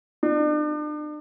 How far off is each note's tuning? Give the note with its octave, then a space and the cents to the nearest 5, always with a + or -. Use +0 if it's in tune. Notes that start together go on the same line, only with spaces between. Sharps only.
D4 +40